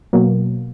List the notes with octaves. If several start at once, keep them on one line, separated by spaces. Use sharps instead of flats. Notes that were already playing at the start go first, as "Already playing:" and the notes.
B2 F#3 A#3